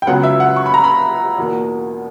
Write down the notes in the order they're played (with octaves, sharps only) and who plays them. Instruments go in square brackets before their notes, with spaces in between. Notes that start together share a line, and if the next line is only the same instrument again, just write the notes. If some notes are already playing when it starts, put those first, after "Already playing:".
[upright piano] G5
C#2 C#3 F#3 B3 F#5
E5
F#5
C#6
B5
A#5
B5
E2 B2 A#3